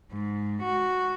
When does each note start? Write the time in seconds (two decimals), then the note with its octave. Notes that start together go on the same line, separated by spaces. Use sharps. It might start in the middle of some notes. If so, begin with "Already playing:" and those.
0.12 G#2
0.64 F#4